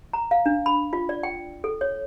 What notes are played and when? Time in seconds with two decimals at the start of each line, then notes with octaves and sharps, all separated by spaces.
0.13 A#5
0.31 F5
0.46 D4
0.66 B5
0.93 F4
1.09 D5
1.23 G5
1.64 A4
1.81 C#5